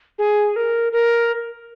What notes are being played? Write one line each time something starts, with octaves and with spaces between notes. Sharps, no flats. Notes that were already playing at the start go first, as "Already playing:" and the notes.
G#4
A#4
A#4